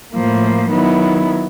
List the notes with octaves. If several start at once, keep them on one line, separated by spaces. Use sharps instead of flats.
A2 F3 A#3
D#3 F#3 B3 E4